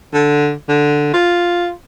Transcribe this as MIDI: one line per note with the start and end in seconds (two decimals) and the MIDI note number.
0.13 0.53 50
0.69 1.09 50
1.13 1.71 65